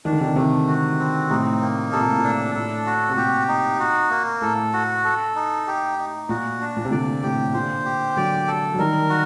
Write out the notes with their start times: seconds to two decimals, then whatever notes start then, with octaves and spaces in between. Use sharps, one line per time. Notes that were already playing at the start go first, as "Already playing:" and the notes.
0.05 D#3 D4
0.13 D3
0.21 C3 D#3
0.36 C3 D#3 A3
0.68 F#4
0.99 C4
1.30 A2 C3 D#4
1.61 A#3
1.92 C3 A4
2.01 A#2
2.09 A2
2.17 A#2
2.24 D4
2.55 A2 A4
2.86 F#4
3.09 C3
3.17 A#2 G4
3.48 D#4
3.80 F#4
4.10 A#3
4.42 A2 A4
4.73 F#4
5.05 A4
5.35 D#4
5.67 G4
5.98 D#4
6.29 A#2 F#4
6.61 D4
6.77 A#2
6.85 C3
6.91 A#2 D3 D5
7.23 A2 C3 G4
7.53 A#2 D3 C5
7.85 G4
8.17 D3 F#3 D5
8.48 A4
8.74 F#3
8.78 D#3 G3 A#4
9.10 F#4